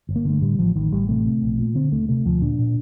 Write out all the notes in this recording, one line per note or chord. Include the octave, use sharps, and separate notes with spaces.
G1
A#3
D3 A3
A2 G3
A1 F3
A1 D#3
A1 G3
C3 A3
C3
A#1
A#2
D3 C4
D2 A3
C3 A3
D2 F3
A#2 D4
A#2